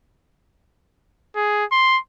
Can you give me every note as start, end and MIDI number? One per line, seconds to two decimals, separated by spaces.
1.36 1.65 68
1.72 1.99 84